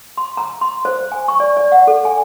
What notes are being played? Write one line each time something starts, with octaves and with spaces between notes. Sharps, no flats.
C6
A#5
C6
C5
G#5
C#6
D5
D5
F#5
A4
G#5